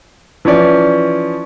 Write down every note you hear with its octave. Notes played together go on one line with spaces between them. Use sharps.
E3 F3 C#4 D5